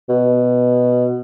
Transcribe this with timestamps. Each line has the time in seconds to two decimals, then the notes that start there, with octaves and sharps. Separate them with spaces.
0.09 B2